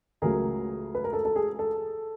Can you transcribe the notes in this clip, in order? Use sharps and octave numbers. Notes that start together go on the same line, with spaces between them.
C#2 C#3 F#3 A3 G#4 A#4
B4
A#4
A4
A4
G#4
A4